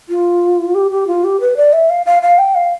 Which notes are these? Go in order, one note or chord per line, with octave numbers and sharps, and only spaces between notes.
F4
G4
G4
F4
G4
B4
D5
E5
F5
F5
F5
G5
F5